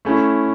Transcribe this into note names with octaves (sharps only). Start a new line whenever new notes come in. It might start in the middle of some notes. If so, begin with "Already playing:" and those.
A3 C#4 E4